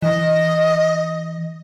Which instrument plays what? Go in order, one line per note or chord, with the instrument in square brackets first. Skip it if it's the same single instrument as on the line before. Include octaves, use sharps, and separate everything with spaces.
[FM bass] E3 [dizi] D#5